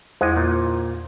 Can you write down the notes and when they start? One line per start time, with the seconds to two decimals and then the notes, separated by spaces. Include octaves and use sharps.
0.21 E2 G#3 E4 C5 F#5
0.37 A#2